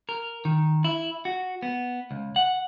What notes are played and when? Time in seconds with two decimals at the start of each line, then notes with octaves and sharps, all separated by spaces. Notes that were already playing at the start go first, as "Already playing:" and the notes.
0.09 A#4
0.45 D#3
0.84 E4
1.25 F#4
1.62 B3
2.11 C#2
2.36 F#5